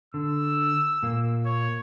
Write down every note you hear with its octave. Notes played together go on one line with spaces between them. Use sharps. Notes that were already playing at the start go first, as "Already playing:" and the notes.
D3 E6
A#2 A#3
C#5